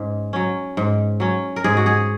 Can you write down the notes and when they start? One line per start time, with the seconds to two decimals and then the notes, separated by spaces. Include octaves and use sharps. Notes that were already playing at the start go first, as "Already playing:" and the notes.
Already playing: G#2 C#4
0.33 F#3 C#4
0.77 G#2
1.20 F#3 C#4
1.56 A#4
1.64 G#2 G#4
1.77 F#4
1.86 G#4